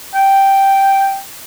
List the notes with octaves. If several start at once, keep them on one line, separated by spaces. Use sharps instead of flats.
G5